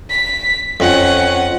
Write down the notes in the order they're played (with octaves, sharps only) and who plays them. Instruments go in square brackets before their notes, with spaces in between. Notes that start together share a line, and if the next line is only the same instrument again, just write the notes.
[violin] B6
[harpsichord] F2 [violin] C#4 F#5